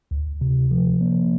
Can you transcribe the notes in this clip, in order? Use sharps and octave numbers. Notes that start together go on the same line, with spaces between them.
D2
C3
F3
A#3